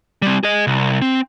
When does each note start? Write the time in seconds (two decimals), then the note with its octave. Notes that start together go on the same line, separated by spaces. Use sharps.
0.22 G3 C4
0.43 G#4 D#5
0.67 C2
1.02 C4